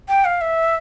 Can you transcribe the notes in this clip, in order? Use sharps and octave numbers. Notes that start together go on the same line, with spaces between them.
G5
F5
E5